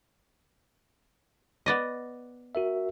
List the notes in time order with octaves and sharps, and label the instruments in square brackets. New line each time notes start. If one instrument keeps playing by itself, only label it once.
[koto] B3 D5 D#5
[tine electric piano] F#4 A#4 E5